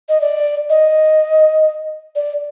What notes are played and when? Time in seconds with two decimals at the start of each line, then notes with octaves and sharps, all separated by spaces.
0.09 D#5
0.21 D5
0.69 D#5
2.15 D5